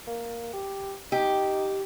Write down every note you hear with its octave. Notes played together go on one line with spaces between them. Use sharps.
A#3
G4
D#4 G4